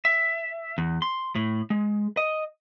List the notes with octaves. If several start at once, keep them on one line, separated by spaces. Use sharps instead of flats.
E5
E2
C6
A2
G#3
D#5